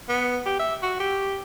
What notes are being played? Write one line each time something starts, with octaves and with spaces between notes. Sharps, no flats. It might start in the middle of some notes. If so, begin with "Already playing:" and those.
B3
G4
E5
F#4
G4